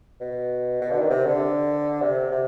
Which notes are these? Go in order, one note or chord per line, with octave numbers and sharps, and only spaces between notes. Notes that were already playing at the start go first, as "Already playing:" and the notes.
B2
B2
D3
D#3
C3
D3
C3
C3